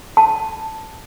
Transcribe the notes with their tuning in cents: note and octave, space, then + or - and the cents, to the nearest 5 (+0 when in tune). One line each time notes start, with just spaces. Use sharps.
A5 +5